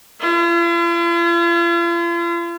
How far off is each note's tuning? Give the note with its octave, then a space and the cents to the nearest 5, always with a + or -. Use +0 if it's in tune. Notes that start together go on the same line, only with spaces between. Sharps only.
F4 -45